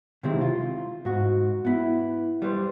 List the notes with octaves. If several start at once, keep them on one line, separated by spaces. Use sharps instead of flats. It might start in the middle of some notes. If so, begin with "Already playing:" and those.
C3 D#3 G#3 C4 E4
F4
G#2 F#4
B3 E4
G3 B4 C5